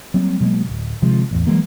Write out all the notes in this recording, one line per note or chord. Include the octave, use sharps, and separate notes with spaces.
F#3 G3 A#3 C4
B2 F#3 G#3 A#3
D1
C3 D#3 F3 G#3
A1 E2
E3 F#3 G#3 A#3